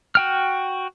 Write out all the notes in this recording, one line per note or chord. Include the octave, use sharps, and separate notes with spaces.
F#4 G5 F6